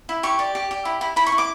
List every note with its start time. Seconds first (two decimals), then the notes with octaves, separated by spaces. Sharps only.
0.09 E4
0.23 G4 C#6
0.39 D5
0.55 G4
0.71 G4
0.85 E4
1.01 E4
1.16 E4 B5
1.27 C#6
1.32 E4
1.38 D6